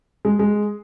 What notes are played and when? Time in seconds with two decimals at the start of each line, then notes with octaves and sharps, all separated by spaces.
0.25 G#3
0.39 G#3